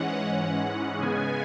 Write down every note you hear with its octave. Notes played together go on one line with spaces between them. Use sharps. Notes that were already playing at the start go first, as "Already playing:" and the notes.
Already playing: G#2 E3 G#3 C#4 F#5
C#3 G#3 B3 G#5